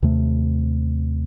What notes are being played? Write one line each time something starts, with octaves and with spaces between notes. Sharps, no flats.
D#2 C3 A3